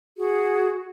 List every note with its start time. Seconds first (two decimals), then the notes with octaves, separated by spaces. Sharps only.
0.17 F#4 G#4